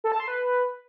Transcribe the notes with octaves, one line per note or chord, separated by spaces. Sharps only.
A4
A5
C6
B4